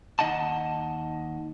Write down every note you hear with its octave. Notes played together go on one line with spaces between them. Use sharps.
D#2 D#4 D#5 F#5 A5